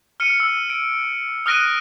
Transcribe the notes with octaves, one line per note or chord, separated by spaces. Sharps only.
F6 C#7 D#7
E6
D7
D#6 F6 F#6 A#6 D7 D#7